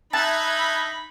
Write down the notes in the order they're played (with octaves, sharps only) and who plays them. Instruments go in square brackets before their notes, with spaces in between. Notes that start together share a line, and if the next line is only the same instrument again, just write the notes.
[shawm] D#4 [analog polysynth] E5 F#6 G#6 [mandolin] A5 [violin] B5